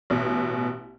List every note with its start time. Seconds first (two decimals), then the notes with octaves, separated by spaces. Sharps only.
0.10 A1 B2